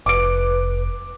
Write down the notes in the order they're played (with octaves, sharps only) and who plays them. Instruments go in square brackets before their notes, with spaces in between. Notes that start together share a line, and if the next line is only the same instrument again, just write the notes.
[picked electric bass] F1 [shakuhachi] B4 [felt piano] D6 D7